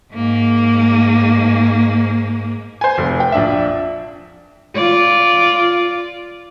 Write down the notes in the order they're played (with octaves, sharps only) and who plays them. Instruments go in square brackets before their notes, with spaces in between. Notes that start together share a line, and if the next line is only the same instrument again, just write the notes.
[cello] G#2 A#3
[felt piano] C5 G#5
F1
G5
A#1 D4 E5
[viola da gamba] F4 D5